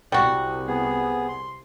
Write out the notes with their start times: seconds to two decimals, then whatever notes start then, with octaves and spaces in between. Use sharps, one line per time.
0.12 C2 G3 F#4
0.67 B3 G#4
1.29 C6